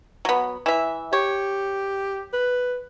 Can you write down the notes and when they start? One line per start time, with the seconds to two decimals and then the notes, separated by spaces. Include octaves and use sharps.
0.25 F#3 B3
0.66 E3 E5
1.13 G4 C#5
2.33 B4